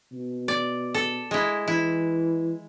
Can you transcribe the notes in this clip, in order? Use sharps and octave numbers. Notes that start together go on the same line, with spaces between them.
B2
D5
A4
G#3 E4
E3 E4